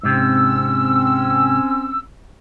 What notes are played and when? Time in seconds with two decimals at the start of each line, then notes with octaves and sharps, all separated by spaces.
0.03 G#2 C3 C4 C#4 E6